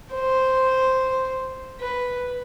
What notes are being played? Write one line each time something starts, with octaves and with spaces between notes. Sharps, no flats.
C5
B4